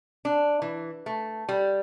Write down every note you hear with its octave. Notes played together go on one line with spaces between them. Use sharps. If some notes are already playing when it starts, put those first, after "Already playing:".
D4
E3
A3
G3